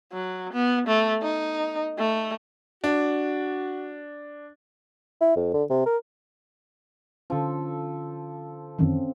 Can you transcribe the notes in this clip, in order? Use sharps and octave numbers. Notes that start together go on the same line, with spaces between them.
F#3
B3
A3
D#4
A3
D4 F#4
E4
F2
D3
C3
A#4
D3 F3 C#4 A4
F#2 D#3 E3 C4 C#4